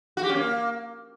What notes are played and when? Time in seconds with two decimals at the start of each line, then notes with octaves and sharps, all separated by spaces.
0.17 F#4
0.23 G4
0.30 C#4
0.36 A#3